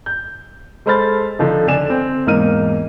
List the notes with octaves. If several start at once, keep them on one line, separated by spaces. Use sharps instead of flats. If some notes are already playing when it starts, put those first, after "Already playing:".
G6
G#3 A4 C5 B5 F6 A6
D3 F3 D#4
D3 D5 G#5 E7
C4
E1 G#2 A#3 D#4 F6 D#7